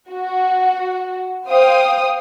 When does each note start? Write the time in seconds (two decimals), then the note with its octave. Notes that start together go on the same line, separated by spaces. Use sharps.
0.11 F#4
1.46 C5 F5 G5 D#6